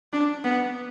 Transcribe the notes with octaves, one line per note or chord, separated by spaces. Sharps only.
D4
B3